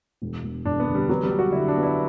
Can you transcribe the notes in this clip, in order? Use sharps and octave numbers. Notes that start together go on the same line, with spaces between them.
E1
E1
E1 D4
B3
D3
G3
F#3 B3
G3
B3
F#4
D3 E4
D4
B3
E4